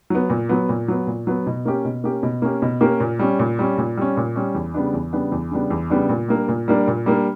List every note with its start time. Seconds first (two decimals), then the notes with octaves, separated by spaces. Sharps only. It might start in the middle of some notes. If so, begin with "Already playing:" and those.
0.10 F#3 B3
0.30 A#2
0.49 F#3 B3
0.69 A#2
0.88 F#3 B3
1.07 A#2
1.27 F#3 B3
1.47 B2
1.65 A#3 C#4 G4
1.85 B2
2.04 A#3 C#4 G4
2.23 B2
2.42 A#3 C#4 G4
2.62 B2
2.81 A#3 C#4 G4
3.00 A#2
3.19 G3 C#4
3.39 A#2
3.59 G3 C#4
3.78 A#2
3.97 G3 C#4
4.17 A#2
4.36 G3 C#4
4.55 E2
4.74 C#3 G3 B3 D4
4.94 E2
5.13 C#3 G3 B3 D4
5.32 E2
5.51 C#3 G3 B3 D4
5.70 E2
5.90 C#3 G3 B3 D4
6.09 A#2
6.28 G3 A#3 D4
6.48 A#2
6.68 G3 A#3 D4
6.88 A#2
7.06 G3 A#3 D4